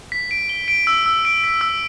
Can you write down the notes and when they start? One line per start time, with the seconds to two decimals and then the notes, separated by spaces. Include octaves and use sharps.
0.12 B6
0.31 D7
0.49 G7
0.68 D7
0.87 E6
1.06 E6
1.25 D7
1.44 B6
1.61 E6